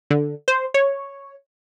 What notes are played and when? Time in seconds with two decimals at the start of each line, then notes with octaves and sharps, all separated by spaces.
0.11 D3
0.48 C5
0.74 C#5